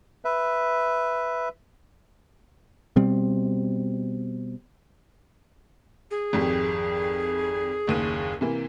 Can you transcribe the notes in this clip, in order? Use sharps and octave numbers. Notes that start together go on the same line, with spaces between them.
B4 E5
B2 G3 C4
G#4
G#1 F2 G4
F#1 D#2 D#7
C3 E3 A#3